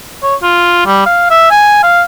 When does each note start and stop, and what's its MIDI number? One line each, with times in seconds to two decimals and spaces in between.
0.23 0.35 73
0.43 0.85 65
0.86 1.02 55
1.06 1.30 77
1.30 1.47 76
1.51 1.81 80
1.83 2.02 77